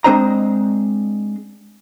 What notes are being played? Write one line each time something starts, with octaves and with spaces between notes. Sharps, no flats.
G#3 C4 D4 C5 D#5 A#5